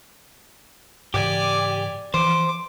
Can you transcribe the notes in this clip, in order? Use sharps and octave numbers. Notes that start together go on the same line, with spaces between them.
G#2 C#3 E3 G4 D5 G#5
E3 F3 C5 D6